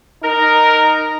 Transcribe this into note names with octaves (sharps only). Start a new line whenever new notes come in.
D#4 A#4